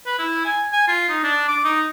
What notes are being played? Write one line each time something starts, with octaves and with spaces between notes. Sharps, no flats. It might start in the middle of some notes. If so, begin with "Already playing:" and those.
B4
E4
G#5
G#5
F4
D#4
D4
D6
D#4